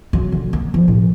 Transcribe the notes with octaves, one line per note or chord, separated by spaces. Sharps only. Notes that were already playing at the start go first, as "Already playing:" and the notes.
F#3
D3
A#3
F3
A2